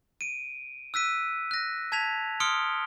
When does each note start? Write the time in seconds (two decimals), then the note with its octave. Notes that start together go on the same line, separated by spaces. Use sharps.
0.21 D7 D#7
0.94 E6 F#6 B6 D#7
1.51 F#6 A#6
1.92 A5 G#6 B6 F7
2.40 C6 D#6 F6 C#7 D7 G7